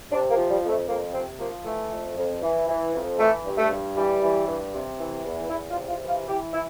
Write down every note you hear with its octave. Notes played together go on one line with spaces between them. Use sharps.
C3 D4
A#3
F3
G3
F2
A3
F2 A#3
C3 C4
F3 A#3
E3 A3
F2
F2
E3
E3
F2
E3 A3
G2
A3
G2
E3 G3
E3
G2
C3
E3
E2
E2 E4
F4
C3
F4
E3
F4
E3 G4
E4